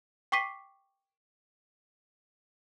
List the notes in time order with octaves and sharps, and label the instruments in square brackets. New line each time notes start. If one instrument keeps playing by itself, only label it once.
[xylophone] G5 C#6 D6 B6 C7 D#7